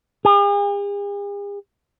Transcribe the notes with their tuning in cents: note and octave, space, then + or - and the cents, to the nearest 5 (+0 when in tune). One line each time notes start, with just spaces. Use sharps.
G#4 -45